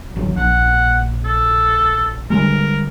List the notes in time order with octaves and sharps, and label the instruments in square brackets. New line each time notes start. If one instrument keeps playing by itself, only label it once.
[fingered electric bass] D1 G#1 F#3
[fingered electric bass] A#1 [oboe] F#5
[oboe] A4
[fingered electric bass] D3 G3 G#3 [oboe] A#4